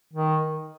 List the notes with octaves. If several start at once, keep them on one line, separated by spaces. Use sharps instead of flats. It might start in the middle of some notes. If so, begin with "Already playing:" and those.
D#3